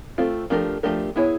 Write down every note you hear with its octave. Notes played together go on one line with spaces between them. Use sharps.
A3 C4 F4
F3 A3 D4 G4 A#4
F3 A3 D4 G4 A#4
B3 E4 G#4 C#5